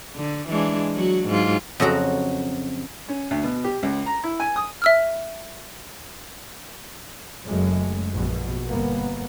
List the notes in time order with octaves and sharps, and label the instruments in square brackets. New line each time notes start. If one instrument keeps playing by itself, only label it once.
[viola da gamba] D3
E3 G#3 D4
F#3 F#4
G#2 F#3 F4
[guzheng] F2 C#3 F#3 F#4 A#5
[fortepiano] C#4
D2
B2
G4
C#2
A#5
E4
G#5
D#6
[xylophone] E5 E6 F6
[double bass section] F#1 F#2 G#3 A3
A#1 B2
G1 A#3 B3